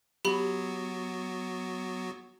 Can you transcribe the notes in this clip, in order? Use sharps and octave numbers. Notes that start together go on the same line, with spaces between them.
F#3 B3 F#4 G4 B5